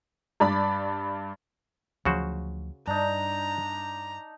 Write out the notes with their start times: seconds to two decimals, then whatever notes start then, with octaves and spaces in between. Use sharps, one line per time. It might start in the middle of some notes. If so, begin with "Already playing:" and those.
0.40 G2 D5 B5
2.05 D2 C#3 F3 F#3 F#4 C5
2.87 G2 D4 D#4 A#5